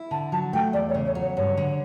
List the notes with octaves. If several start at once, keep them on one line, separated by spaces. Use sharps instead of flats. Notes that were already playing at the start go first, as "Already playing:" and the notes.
Already playing: E4
D3 A5
F#3 A5
A3 G5
E2 D5
C#5
C#3
C#5
F#3
C#5
G2 C#5
D3